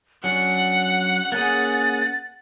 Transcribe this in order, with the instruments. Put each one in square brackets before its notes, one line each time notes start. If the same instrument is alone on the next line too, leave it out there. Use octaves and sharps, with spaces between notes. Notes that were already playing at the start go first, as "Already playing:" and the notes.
[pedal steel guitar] F#3 C#4 D4 [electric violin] F#5 [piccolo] C#7
[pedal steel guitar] A#3 C#4 G#4 [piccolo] A6